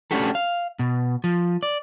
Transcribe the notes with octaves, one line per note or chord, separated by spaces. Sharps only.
A3 C#4 D4 F#4 G4 A4
F5
B2
F3
D5